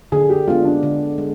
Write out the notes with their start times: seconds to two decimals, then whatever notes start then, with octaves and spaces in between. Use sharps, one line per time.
0.12 D3 G#4
0.30 G4
0.48 G#3 B3 D4 F4
0.65 D4
0.83 D3
1.18 G#3